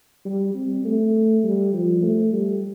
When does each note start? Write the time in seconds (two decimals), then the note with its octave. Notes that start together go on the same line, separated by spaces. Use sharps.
0.25 G3
0.55 C4
0.85 A3
1.44 G3
1.73 F3
2.03 A3
2.33 G3